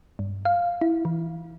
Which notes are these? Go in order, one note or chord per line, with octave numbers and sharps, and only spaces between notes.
G2
F5
E4
E3